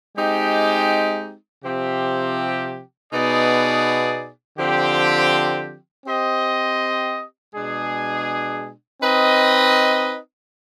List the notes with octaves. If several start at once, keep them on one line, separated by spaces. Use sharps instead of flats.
G#3 C4 D#4 G4
C3 F3 C4 G4
B2 B3 D#4 G#4 D5
D3 F3 C4 G4
C4 G4 C5 D#5
B2 G#3 D4 G#4
C4 D#4 B4 D#5